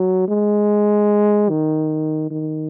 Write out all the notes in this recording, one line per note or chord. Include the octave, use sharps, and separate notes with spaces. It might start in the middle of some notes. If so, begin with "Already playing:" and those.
Already playing: F#3
G#3
D#3
D#3